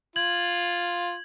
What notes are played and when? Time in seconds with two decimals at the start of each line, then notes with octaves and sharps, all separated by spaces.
0.16 F4 G#6 F#7